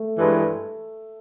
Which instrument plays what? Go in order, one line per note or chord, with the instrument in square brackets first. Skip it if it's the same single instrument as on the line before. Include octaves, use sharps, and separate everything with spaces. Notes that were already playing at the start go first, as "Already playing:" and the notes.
Already playing: [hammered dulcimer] A3
[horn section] G2 E3 G#3